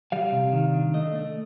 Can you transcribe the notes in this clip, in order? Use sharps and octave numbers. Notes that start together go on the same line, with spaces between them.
G3 F5
C3
D#3
D4
A3 D#5
A3